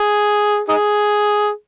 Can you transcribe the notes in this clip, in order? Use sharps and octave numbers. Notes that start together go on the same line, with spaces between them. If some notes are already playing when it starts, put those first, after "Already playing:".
Already playing: G#4
D#4 G#4